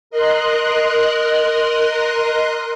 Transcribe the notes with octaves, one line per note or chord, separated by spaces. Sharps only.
A#4 D#5 C6 F#6